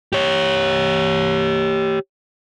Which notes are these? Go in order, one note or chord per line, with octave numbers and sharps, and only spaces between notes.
G4 C#5